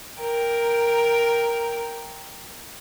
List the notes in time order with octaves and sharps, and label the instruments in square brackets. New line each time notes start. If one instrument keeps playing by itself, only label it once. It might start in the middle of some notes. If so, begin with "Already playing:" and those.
[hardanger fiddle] A#4 G5